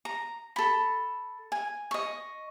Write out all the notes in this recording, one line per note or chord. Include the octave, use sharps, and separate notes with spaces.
A#5
A4 B5
G#5
D#5 C#6